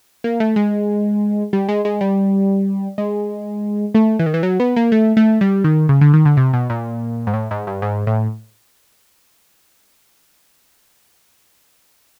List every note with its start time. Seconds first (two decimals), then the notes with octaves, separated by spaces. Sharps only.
0.24 A#3
0.40 A3
0.56 G#3
1.53 G3
1.69 G#3
1.85 G#3
2.01 G3
2.98 G#3
3.95 A3
4.19 E3
4.26 D#3
4.34 E3
4.43 F#3
4.60 B3
4.76 A#3
4.92 A3
5.17 A3
5.41 G3
5.64 D#3
5.89 C#3
6.01 D3
6.14 D#3
6.25 D3
6.37 C3
6.53 B2
6.70 A#2
7.27 G#2
7.34 A2
7.51 G#2
7.67 G2
7.82 G#2
8.07 A2